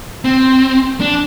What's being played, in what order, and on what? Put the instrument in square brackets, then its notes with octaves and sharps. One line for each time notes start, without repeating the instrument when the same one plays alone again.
[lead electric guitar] C4
D4